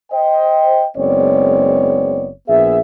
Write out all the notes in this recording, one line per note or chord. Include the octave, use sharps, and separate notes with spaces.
C5 D#5 G5
F#1 G#3 B3 C4 C#5 D5
A#1 B3 G#4 E5